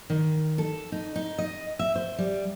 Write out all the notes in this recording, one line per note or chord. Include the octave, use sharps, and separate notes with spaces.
D#3
A4
D#4
D#4
D#5
E5
C5
G3